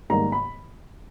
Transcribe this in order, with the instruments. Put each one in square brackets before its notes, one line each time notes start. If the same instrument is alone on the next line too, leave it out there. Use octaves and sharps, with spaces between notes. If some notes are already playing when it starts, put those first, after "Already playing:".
[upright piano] G#2 D#3 G3 A#3 A#5
B5